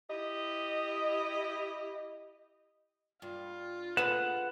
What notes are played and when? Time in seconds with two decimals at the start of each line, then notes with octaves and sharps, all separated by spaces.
0.10 E4 G4 D#5
3.22 G2 F4
3.97 G#4 B4 F#5 E7